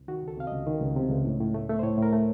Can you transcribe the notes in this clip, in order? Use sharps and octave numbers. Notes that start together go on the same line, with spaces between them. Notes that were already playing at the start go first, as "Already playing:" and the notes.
Already playing: C2
D#3 F#4
C#2 A4
C3 F5
C#2 D#5
D#3
C#2
C3
C#2
A2
A2
A3
A3
C5
A2 C#5
A2 A#4
A3